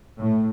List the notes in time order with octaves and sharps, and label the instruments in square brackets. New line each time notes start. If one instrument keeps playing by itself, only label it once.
[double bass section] A2